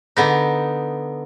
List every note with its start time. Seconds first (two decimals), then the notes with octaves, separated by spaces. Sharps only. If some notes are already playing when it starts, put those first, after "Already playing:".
0.17 D3 B3 D#4